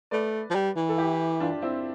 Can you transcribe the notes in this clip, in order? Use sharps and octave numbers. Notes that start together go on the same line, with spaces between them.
A3 B4 D5
F3
G3
E3
A4
E4 G4
D4 F4
C4 E4